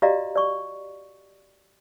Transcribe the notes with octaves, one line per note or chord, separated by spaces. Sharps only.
F#4 G4 D5 D#5 F5 A#5
D5 C#6